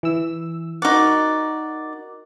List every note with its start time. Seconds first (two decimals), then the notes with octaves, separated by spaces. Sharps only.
0.03 E3 E6
0.82 D#4 F#4 A#4 D5 F#5